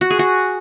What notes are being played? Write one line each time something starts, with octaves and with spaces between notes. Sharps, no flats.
F#4
G#4
F#4